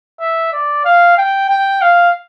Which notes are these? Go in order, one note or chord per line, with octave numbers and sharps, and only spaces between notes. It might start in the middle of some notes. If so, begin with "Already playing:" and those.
E5
D5
F5
G5
G5
F5